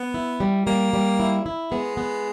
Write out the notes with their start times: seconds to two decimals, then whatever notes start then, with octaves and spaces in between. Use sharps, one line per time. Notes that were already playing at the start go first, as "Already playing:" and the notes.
Already playing: B3
0.14 E4
0.40 G3
0.67 G3 A#3
0.94 G3
1.20 E4
1.46 E4
1.71 G#3 B3
1.97 B3